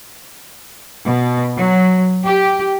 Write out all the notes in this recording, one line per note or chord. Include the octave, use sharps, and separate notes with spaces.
B2
F#3
G4